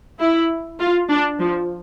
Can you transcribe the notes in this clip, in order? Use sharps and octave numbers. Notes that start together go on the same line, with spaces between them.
E4
F4
D4
F3